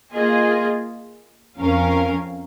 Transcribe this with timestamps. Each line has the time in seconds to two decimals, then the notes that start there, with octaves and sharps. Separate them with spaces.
0.12 A#3 F4 G#4 D#5
1.59 F2 F3 C#4 A#4 F5